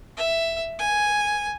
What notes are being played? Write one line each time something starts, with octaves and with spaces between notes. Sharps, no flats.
E5
G#5